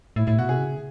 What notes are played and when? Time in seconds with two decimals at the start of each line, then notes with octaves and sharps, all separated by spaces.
0.16 A2 E4
0.27 A2 E4
0.38 B2 F#4
0.49 C3 G#4
0.60 C#3